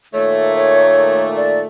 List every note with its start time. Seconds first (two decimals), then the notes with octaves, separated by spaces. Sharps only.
0.13 A#2 D#3 A3 C#5
0.56 C#5
1.36 D5